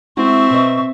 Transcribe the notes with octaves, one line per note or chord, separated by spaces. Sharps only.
G#3 C4 E4 F#4 E5 C#6
B2 D#5